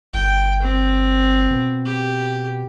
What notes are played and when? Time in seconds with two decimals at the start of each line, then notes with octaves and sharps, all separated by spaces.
0.14 G1 G5
0.62 C4
1.51 B2
1.85 G4